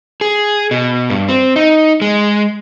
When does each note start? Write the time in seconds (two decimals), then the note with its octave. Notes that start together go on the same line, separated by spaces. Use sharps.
0.21 G#4
0.71 B2
1.10 G2
1.28 C4
1.56 D#4
2.02 G#3